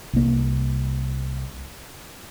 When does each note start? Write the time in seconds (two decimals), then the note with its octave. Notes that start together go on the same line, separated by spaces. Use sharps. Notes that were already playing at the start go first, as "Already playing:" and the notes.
0.13 C2 A#3